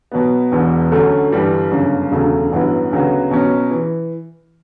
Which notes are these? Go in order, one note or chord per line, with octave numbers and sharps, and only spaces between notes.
B2 F#3 B3
E1 E2 B2
D2 D3 F#3 A3 C#4
G1 G2 E3 G3
G1 F#2 C#3
E1 D2 C#3 F#3 A3
A1 G2 F#3 B3 E4
D2 C#3 F#3 B3 F#4
B2 F#3 C#4
E3